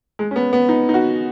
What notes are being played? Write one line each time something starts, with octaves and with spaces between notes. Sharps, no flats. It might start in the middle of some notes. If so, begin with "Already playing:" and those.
G#3
C#4
B3
B3
D#4
D#4
F#4